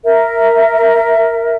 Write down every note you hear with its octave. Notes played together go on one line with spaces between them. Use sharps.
A#4 E5